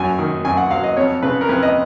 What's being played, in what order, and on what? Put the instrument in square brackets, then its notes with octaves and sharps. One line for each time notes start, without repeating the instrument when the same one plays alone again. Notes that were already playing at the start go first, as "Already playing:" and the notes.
Already playing: [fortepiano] F#2 F#3 G#5
D#3
F#2 G#5
F#5
F#3 F5
D#5
F2 C#5
C#3 B4
A#4
F2 B4
D#5